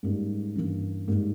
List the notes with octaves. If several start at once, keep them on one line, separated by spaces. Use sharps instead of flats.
G#2 G3 A#3 C#4
G2 E3 A#3 C#4
G#2 G3 A#3